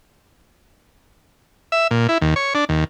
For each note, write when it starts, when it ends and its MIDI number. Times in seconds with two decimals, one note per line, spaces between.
1.72 1.87 76
1.91 2.07 46
2.09 2.18 64
2.21 2.34 39
2.36 2.54 73
2.55 2.65 62
2.69 2.84 39